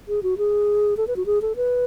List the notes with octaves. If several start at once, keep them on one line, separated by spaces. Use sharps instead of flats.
G#4
F#4
G#4
A4
B4
F#4
G#4
A4
B4